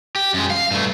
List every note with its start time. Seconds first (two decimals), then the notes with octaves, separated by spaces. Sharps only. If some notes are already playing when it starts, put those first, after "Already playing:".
0.15 G4
0.34 F#2 G#3
0.50 F5
0.71 G2 A3